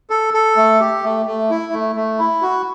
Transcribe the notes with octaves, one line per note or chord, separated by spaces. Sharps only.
A4
A4
A3
G4
A3
A3
E4
A3
A3
E4
F#4